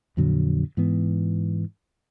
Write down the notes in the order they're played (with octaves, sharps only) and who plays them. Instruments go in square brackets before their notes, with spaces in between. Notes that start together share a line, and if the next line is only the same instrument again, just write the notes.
[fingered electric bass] F2 A#2 D3 F#3
G#2 E3 B3